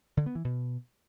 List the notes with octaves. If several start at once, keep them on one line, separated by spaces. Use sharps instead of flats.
D3
B3
E3
B2